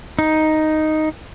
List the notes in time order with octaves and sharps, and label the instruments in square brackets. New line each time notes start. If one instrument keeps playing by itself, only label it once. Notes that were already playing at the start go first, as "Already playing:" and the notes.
[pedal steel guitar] D#4